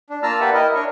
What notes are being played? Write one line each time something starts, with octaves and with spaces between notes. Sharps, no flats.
D4
A#3 F4 A5 A#5 E6 F6
A#3 G4 B4 D5 E5 F#5
E4 A#4 D#5
D4 A#4 C#5 C#6